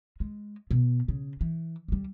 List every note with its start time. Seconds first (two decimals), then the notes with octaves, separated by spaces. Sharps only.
0.20 G#3
0.71 B2
1.08 C#3
1.41 E3
1.88 D2 G3